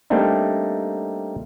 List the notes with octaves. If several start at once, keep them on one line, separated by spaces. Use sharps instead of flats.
G3 A3 A#3 C4 D4 D#4